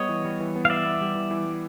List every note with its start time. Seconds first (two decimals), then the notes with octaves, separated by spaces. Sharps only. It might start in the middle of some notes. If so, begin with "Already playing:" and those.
Already playing: G3 B3 C#5 D#5
0.09 E3
0.25 G3
0.40 E3
0.56 B3
0.65 F5
0.70 E3 D5 E5
0.86 B3
1.01 G3
1.15 E3
1.31 E3
1.46 G3